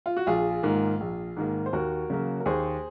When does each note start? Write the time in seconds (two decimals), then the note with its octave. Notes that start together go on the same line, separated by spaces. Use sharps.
0.06 F4
0.17 F#4
0.27 A#1 F4 G#4
0.63 G#2 D#3 A#3
1.00 A#1
1.37 G#2 D#3 A#3
1.66 C5
1.73 D#2 F#4 A#4
2.10 C#3 F#3 A#3
2.40 A#4
2.46 D#2 G#4 C5